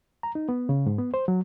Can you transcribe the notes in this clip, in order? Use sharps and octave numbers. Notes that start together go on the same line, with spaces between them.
A#5
D#4
B3
C#3
G#2
B3
C5
F#3